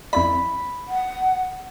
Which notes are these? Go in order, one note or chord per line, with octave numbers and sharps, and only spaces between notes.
F2 E4 D5 B5
F#5